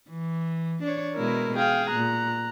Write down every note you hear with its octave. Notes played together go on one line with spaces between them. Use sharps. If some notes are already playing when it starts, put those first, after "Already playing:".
E3
D4 C#5
B2 G#3 E4 A#4
G#4 F5 G5
A#2 A#5 F#6